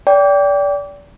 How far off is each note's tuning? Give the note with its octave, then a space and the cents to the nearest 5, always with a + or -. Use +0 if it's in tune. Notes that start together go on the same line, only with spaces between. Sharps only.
D5 -30 G5 +0